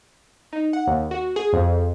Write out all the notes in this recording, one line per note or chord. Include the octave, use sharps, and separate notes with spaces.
D#4
F#5
D#2
F#4
G#4
F2